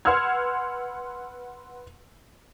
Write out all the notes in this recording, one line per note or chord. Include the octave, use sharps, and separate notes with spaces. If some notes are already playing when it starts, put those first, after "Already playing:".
B4 F#5 C6 E6 F6 G#6